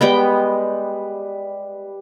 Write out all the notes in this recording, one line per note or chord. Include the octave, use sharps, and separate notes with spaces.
G3 G#3 B3 B4 G5